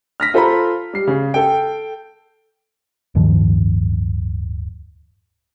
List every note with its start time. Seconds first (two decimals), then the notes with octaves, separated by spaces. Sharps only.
0.20 F6 A#6 B6
0.34 F4 A4 C5 A#5 B5
0.93 G3 C7
1.07 C#3
1.34 A4 G5
3.15 D1 G2 D#3 F3